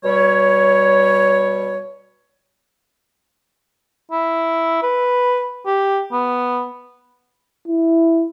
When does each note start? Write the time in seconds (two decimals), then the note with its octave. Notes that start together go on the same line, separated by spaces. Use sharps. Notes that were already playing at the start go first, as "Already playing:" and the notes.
0.04 B2 G3 C#5
4.11 E4
4.83 B4
5.66 G4
6.12 B3
7.68 E4